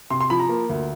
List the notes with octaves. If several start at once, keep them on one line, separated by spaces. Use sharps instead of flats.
C3 C6
C6
F3 B5
A#5
A#3
D2